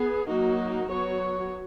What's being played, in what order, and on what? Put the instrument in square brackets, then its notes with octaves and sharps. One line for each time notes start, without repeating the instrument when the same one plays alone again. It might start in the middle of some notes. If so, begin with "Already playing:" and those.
Already playing: [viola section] B3 G#4
F#3 A#3 D#4 F#4
F#3 B3 F#4 C#5